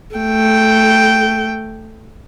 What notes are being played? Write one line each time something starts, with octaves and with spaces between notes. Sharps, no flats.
A3 G5